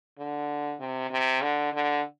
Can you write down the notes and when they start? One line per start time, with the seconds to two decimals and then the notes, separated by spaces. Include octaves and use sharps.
0.19 D3
0.80 C3
1.11 C3
1.42 D3
1.73 D3